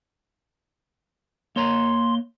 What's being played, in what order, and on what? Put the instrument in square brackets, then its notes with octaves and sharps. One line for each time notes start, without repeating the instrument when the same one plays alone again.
[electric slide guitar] A#3 C#5 A#5 [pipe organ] C6